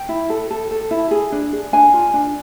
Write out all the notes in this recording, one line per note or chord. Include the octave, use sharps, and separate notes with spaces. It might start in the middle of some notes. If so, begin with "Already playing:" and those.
Already playing: G5
E4
A4
A4
A4
E4
G#4
D4
G#4
D4 G#5
F4
D4